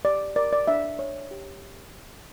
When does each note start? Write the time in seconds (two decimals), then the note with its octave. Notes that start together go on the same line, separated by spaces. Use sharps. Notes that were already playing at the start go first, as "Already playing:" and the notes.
0.05 G4 D5
0.36 A#4 D5
0.53 D5
0.68 D4 E5
0.99 C#5
1.31 G4